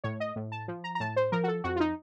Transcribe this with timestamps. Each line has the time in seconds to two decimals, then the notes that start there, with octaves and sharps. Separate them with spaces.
0.04 A2 C#5
0.20 D#5
0.36 A2
0.52 A5
0.68 F3
0.84 A#5
0.95 A#5
1.00 A2 A5
1.16 C5
1.32 F3 A#4
1.44 F#4
1.48 A4
1.64 F2 F#4
1.76 F4
1.80 D#4